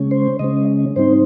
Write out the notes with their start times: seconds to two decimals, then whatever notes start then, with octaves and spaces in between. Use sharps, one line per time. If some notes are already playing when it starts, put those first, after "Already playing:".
Already playing: C#3 G#3 C#4
0.11 C5
0.39 C#3 G#3 C#4 D#5
0.96 G#2 G3 C4 D#4 C5